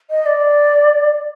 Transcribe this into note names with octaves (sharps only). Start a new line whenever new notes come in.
D#5
D5